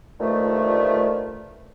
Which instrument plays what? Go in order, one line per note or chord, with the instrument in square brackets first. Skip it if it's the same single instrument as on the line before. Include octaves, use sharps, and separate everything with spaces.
[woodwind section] G2 A#2 D3 D#3 F3 A3